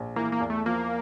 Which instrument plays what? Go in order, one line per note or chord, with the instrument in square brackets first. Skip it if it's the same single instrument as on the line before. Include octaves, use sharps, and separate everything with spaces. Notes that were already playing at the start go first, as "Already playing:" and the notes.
Already playing: [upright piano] A#1
[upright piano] E3 [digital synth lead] A#3
[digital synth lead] A#3
[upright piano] E2
[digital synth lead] A3
[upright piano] F3 [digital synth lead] A#3